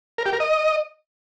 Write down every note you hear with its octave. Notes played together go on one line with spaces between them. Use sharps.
A#4
G4
A#4
D#5